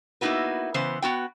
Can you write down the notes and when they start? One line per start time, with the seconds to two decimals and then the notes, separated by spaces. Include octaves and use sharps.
0.21 A#3 B3 D#4 E4 F#4 B4
0.74 C#3 E3 B3 C5
1.02 B3 F#4 G5